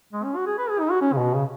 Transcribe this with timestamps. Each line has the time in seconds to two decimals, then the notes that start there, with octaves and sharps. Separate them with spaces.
0.13 G#3
0.24 C#4
0.36 F#4
0.46 G#4
0.58 B4
0.69 G#4
0.80 D#4
0.91 F#4
1.01 C#4
1.12 C#3
1.17 B2
1.35 C#3